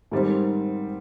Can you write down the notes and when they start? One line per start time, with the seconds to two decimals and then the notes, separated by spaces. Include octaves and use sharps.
0.12 G#2 D#3 G3 C4